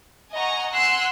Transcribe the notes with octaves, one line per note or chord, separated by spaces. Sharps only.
D#5 F#5 G#5 A#5 C#6
F#5 G#5 C6 E6 F#6